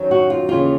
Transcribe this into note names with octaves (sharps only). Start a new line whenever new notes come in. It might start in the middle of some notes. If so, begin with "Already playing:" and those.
Already playing: F#2 D#3 F#3
F#4
F4
D#2 C#3 E3 F4